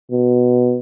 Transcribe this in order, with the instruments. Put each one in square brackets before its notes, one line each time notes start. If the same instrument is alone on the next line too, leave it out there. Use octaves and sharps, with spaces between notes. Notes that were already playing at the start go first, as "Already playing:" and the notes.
[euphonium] B2